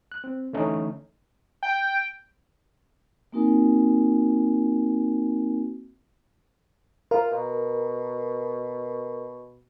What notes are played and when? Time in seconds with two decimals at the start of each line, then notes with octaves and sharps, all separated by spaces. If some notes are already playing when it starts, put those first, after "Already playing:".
0.12 F#6
0.24 C4
0.53 D3 E3 A3 C#4 D#4
1.63 G5
3.32 A#3 C4 D#4 F#4 A#4 G#5
7.11 F4 A#4
7.31 B2